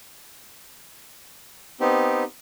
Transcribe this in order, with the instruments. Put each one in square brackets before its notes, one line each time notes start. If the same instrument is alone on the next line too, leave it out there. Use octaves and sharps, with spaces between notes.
[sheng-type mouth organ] B3 C4 D#4 G4